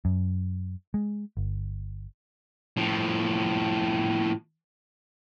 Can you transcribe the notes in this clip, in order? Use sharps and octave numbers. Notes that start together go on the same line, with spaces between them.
F#2
G#3
G1
A2 F3